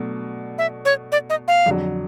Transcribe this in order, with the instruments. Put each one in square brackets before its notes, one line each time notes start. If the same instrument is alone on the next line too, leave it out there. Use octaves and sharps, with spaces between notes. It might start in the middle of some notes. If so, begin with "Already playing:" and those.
Already playing: [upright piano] B2 F#3 A3 D4
[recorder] E5
C#5
D5
D#5
F5
[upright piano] F2 D3 F#3